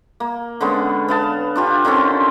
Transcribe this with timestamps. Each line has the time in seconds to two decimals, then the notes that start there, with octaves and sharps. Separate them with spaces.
0.20 A#3
0.61 D3 G#3 B3 C#4
1.08 B3 F5 A5
1.56 D4 F4 G4
1.85 D3 D#3 C4 C#4